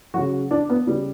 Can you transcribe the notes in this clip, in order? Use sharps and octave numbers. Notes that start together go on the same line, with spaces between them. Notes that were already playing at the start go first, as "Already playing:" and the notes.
C#3 F#3 F#4
D4
B3
C#3 G3